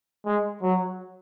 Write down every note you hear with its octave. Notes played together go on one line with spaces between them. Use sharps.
G#3
F#3